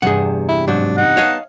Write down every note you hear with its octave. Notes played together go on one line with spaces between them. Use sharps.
E2 G2 C3 G#4 F#5
E4
G#2 F#3 D4
D#4 F#5
B3 C#5 D#5 F5 A5